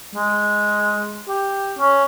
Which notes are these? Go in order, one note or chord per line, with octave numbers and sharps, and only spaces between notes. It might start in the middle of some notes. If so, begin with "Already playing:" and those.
G#3
G4
C#4